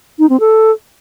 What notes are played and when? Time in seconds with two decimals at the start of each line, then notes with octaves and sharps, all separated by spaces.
0.19 D#4
0.30 C4
0.40 A4